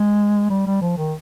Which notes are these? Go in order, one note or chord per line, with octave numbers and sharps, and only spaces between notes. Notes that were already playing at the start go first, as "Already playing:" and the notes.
Already playing: G#3
G3
G3
F3
D#3